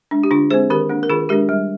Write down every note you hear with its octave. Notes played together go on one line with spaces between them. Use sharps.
G#3 D4
G4
D3 D4 F4
G#3 C4 G#4 C5
D#3 G4 A#4
A#3 D4
A#4
D#3 F4 G#4
G#3 D4 G4 A#4
G3